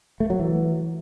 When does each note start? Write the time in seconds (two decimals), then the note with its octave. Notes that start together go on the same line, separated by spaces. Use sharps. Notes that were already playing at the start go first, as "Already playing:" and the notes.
0.20 A3
0.30 F#3
0.39 E3